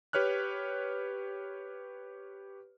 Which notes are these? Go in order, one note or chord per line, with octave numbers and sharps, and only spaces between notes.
G4 B4 C#5 F6 F#6